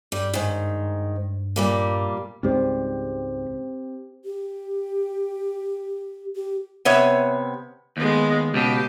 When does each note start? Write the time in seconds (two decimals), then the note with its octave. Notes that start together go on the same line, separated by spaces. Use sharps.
0.12 G2 G3
0.34 G#2 D#3
1.56 A#2 G3 A#3
2.43 C#2 G#2 G3 C4 G4 C5
4.23 G4
6.36 G4
6.85 C3 B3 C#5 E5
7.97 D#2 G#3 B3
8.54 C#2 B2 G4